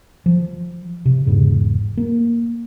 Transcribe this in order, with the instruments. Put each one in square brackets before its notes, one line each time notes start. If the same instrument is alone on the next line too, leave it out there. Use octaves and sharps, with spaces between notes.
[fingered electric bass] F3
C3
E1 G#2 C#3
A#3